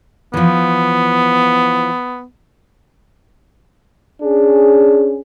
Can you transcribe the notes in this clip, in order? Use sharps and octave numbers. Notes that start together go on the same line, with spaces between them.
E3 F3 B3
C#4 D4 G#4